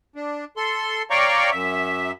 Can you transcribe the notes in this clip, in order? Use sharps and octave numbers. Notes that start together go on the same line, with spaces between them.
D4
A4 C6
C#5 D5 F5 G5 A#5 C#6
F#2 E5